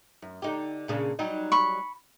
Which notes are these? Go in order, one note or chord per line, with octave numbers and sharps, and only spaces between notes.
F#2
D3 D#4 G4
A#2 C#3 D4
F#3 G3 D#4
B5 C#6